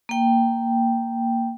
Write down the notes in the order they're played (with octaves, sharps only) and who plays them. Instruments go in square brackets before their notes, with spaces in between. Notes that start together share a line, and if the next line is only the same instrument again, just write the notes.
[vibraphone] A#3 G5